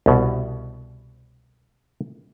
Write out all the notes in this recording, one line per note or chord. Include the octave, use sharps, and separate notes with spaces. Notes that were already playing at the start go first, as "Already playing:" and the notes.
C2 B2